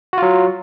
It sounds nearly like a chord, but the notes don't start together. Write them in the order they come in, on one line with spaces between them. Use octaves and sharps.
F#4 F4 F#3